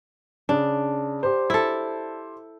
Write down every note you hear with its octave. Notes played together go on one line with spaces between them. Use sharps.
C#3 D4
G4 C5
E4 A4